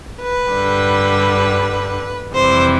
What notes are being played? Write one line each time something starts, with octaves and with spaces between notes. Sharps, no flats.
B4
G2 D3 G3
F2 C3 E3 G3 C5